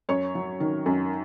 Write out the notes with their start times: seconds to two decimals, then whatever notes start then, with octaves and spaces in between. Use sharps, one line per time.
0.09 F#2 C#5 C#6
0.35 F#3
0.60 D#3
0.86 F#2